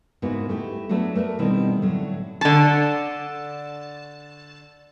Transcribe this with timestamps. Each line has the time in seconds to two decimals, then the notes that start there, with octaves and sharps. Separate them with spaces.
0.22 G#2 C#3 A#3 B3 E4 F#4
0.49 A3 E4 G4
0.89 F#3 A3 B3 D4 F#4
1.15 A3 A#4 B4 D5
1.39 B2 D#3 G3 C4 E4
1.81 A2 D3 F#3
2.41 D3 A5